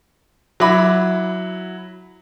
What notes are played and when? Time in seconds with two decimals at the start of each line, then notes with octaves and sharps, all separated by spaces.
0.60 F#3 E4 B5 D6